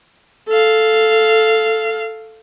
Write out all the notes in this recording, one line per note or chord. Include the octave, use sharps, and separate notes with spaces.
A4 F5